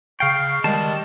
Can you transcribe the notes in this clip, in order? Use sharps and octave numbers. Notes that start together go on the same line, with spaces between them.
C#3 F5 G5 C#6 F6 C7
D#3 G3 G#3 G4 D#5 A5